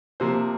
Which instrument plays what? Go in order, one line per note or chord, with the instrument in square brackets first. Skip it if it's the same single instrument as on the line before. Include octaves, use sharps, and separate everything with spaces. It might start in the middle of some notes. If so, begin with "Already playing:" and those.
[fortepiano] C3 F3 A#3 C5